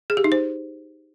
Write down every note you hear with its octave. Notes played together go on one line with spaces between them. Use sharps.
G#4
G4
D#4
C5